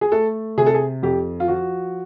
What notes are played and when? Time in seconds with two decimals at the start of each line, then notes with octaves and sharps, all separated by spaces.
0.01 G#4
0.12 A3 A4
0.57 C3 G#4
0.66 A4
0.74 G#4
1.03 F2 G4
1.40 F4
1.48 F3 F#4